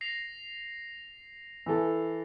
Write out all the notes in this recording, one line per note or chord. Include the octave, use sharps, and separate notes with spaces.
A#6 C7 F7
E3 A4